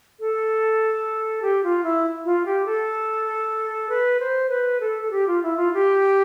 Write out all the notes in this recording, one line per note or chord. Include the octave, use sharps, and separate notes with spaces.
A4
G4
F4
E4
F4
G4
A4
B4
C5
B4
A4
A4
G4
F4
E4
F4
G4